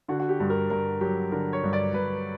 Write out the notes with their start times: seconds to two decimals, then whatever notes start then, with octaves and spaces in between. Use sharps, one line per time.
0.08 D3 F#4
0.20 F#4
0.29 G4
0.40 G2
0.50 A#4
0.70 G2 A#4
1.01 F#3 G4
1.32 D3 A#4
1.53 C#5
1.63 G2
1.73 D5
1.93 G2 B4